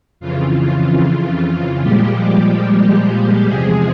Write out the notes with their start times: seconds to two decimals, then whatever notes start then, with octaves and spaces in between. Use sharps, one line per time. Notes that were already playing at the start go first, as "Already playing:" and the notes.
0.20 F2 C#3 E3 F4
0.61 F4
1.82 A#2 F3 G3 G#3 G4
3.45 E2 C3 F3 G#3 G#4